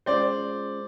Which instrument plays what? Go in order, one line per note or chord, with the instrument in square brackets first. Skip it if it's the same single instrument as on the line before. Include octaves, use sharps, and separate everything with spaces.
[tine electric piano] G#3 C#4 F4 G#4 [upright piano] C5 D5